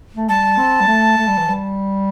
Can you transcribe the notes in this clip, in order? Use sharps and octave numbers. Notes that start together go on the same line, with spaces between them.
A3
G3 A5
C4
G3
A3
A3
G3
E3
G3